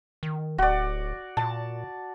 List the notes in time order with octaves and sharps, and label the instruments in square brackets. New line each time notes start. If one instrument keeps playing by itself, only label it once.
[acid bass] D#3
[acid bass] D1 [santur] F#4 D5
[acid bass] A#2 [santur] A5